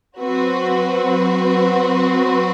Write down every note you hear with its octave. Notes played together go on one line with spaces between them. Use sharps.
F#3 C4 F#4 B4